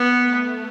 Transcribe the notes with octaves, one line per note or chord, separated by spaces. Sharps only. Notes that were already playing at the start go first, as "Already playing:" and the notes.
Already playing: B3
A3